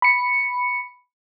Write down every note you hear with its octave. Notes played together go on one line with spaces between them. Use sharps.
B5 C#7